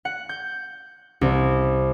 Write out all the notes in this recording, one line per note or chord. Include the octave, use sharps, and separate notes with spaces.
F#5
G6
C2